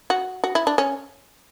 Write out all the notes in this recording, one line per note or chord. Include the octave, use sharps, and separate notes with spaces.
F#4
F#4
E4
D4
C#4